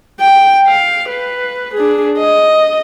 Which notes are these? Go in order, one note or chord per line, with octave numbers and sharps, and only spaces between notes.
G5
F5
B4
D4 G#4
D#5